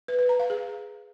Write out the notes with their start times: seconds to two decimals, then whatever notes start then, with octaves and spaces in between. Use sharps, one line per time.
0.08 B4
0.19 B4
0.29 A#5
0.40 F5
0.50 G#4